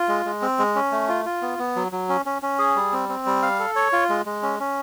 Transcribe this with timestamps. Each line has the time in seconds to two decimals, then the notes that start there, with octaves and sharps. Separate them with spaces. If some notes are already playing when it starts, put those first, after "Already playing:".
Already playing: F4
0.08 G#3
0.25 G#3
0.42 C4
0.59 G#3
0.76 C#4
0.92 A3
1.09 F4
1.25 F4
1.42 B3
1.59 B3
1.76 F#3
1.92 F#3
2.09 C#4
2.26 C#4
2.42 C#4
2.59 G#4
2.76 G3
2.92 C4
3.09 C4
3.26 G3
3.42 F5
3.59 A4
3.76 C#5
3.93 F4
4.09 G#3
4.26 G#3
4.43 C#4
4.60 C#4